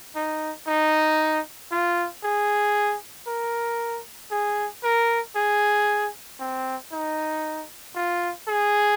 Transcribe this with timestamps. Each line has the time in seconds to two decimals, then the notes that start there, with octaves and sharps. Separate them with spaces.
0.16 D#4
0.67 D#4
1.72 F4
2.24 G#4
3.28 A#4
4.31 G#4
4.83 A#4
5.36 G#4
6.40 C4
6.92 D#4
7.95 F4
8.48 G#4